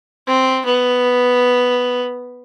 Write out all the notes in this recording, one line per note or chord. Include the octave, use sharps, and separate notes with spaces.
C4
B3